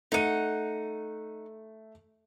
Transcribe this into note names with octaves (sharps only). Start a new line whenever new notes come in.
A3 D#4 F#5 D#7